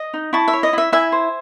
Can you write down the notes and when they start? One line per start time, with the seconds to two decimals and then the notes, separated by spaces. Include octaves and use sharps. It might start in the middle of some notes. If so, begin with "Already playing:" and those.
Already playing: D#5
0.14 D#4
0.33 E4 A5 C#6
0.48 E5
0.53 C#5
0.63 D#5
0.73 E4 E5
0.92 E4 E5 G#5
1.12 C5